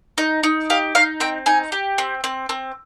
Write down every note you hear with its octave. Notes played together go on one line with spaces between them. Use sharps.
D#4
D#4
G4 F5
D#4 F5
C4 G5
D#4 G#5
G4
C4
C4
C4